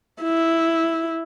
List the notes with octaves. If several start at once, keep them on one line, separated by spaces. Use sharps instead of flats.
E4